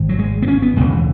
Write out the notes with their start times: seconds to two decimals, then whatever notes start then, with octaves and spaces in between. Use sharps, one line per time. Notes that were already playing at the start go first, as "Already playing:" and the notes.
Already playing: G#1 G#2
0.09 F#3
0.19 G#3
0.42 B3
0.48 C#4
0.62 B3
0.76 E1 D#2 C#3 G#3
0.91 E3